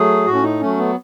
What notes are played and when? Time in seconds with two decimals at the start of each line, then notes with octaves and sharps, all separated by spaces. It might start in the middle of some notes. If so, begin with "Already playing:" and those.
Already playing: F#3 A3 G#4
0.26 A2 F#4
0.34 C#4
0.43 D#4
0.61 F#3 A3 C#4
0.78 B3